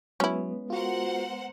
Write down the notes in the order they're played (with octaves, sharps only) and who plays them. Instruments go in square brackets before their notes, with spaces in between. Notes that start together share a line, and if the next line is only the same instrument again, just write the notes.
[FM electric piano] F#3 [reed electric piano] G#3 B3 B4 [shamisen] C#4 E4
[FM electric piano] F4 F#4 [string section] A#4 C5 F#5